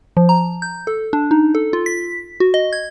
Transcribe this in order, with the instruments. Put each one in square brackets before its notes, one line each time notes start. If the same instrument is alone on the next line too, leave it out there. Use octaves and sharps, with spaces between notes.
[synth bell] F3
A#5
G6
A4
D4
D#4
A4
F4
B6
F#4
D#5
G#6